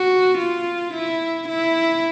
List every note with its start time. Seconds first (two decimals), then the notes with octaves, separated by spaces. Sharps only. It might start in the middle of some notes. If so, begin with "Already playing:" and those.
Already playing: F#4
0.38 F4
0.93 E4
1.48 E4